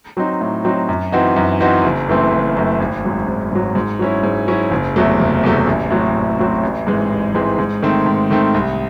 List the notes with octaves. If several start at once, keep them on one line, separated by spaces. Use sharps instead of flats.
F#3 C4 D#4
A2
F#3 C4 D#4
F#2
E3 C4 D#4 F#4
F#2
E3 C4 D#4 F#4
F#1
F#2 E3 A3 C4
F#1
F#2 E3 A3 C4
G#1
G#2 F#3
G#1
G#2 F#3
G#2
F#3 C#4 E4
G#2
F#3 C#4 E4
F#1
E2 C3 F#3 A3
F#1
E2 C3 F#3 A3
A1
A2 F#3 C4
A1
A2 F#3 C4
A1
G#2 E3 G#3 C4
A1
G#2 E3 G#3 C4
G#2
D#3 A3 C4
G#2
D#3 A3 C4
C2